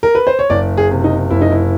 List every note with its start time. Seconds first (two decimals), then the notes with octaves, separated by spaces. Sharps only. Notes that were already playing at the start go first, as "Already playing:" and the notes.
0.03 A#4
0.15 B4
0.27 C5
0.39 C#5
0.50 F#1 D5
0.77 G#4
0.90 C3
1.04 D#4
1.31 F#1 E4
1.41 D#4
1.50 E4